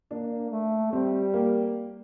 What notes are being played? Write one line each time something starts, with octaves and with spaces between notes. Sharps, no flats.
A#3 D4
A3
G3 C4
A#3